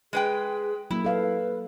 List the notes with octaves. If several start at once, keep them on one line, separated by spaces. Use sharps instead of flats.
G#3 G#4 B4 G5
F#3 A#3 E4
A4 B4 F5